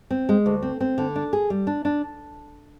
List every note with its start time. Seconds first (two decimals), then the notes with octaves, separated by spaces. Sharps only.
0.11 C4
0.29 G#3
0.46 D2
0.63 C4
0.80 C4
0.98 D3
1.16 D4
1.33 G#4
1.50 G3
1.67 D4
1.85 D4